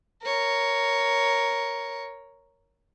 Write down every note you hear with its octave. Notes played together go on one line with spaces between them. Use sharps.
A#4 C#5